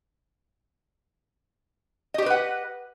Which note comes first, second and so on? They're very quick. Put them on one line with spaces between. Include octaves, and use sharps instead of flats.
D#5 G4 C5 B4 F#5